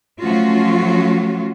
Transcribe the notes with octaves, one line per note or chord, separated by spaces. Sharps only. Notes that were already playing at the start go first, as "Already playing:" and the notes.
F3 F#3 A3 C#4 F4 F#4